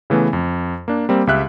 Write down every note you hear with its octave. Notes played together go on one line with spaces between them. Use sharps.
C#3 E3 A3 B3
F2
A#3 D4
G3 A#3 C4
C#2 G4 E5 F#6